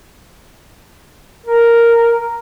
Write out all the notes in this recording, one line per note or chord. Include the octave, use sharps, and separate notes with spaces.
A#4